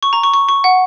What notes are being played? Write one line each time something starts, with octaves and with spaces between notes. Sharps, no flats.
C#6
A#5
C#6
C#6
C#6
F#5